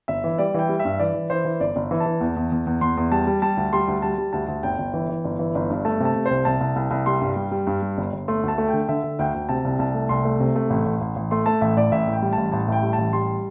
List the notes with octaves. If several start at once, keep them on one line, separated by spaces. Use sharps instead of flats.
G1 E5
E3
G3 D5
E3 G5
G3
E5
G2
E3 D5
E3
E3 C5
E3
G1 D5
G1
E3
A5
E3
E2
E2
E2
E2
E2 C6
E2
G3 A5
G3
G3 A5
D2
G3 C6
D2
G3 A5
G3
D2 A5
D2
G1 G5
G1
E3
E3
G1
E3
G1
G2
A3 A5
C3 A5
C3
C5
C2
C2 A5
C2
C2
C2
G3 C6
G2
G3
G3
G2
G3
G1
G1
A3 C6
D2 A5
A3
G5
D3
D3 E5
D3
D2 G5
D2
C3 A5
C2
C2 A5
A3
C2 C6
A3
C3
A3
A1
A1
A1
A1
A3 C6
A3 A5
A1 E5
A2 D5
A1 E5
A2
G5
G3
A1 A5
A1 A5
A2 G5
G3
A5
A1
G3 C6